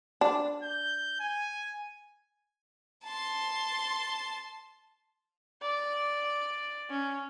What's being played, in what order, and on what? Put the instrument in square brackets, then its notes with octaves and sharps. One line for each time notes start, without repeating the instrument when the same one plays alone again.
[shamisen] D4
[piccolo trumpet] G6
G#5
[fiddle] A5 C6
[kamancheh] D5
C#4